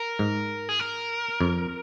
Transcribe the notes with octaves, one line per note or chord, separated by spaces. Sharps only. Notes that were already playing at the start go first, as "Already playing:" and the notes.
Already playing: A#4
G#2
G#4
A#4
F2